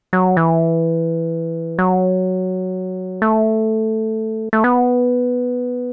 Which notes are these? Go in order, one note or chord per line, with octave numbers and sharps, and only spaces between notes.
F#3
E3
F#3
A3
A3
B3